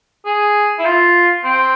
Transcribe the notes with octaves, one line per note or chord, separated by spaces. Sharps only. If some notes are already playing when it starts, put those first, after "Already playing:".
G#4
E4
F4
C4